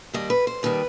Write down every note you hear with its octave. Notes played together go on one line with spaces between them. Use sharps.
D#2 D#3 G3 D#5
B4
C5
D#2 D#3 G3 B4